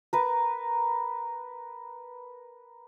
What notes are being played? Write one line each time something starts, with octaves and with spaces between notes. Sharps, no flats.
A#4 B4